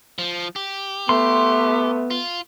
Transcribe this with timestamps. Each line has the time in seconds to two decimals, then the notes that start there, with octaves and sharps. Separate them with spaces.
0.18 F3
0.56 G4
1.09 A3 B3 C6
2.11 F4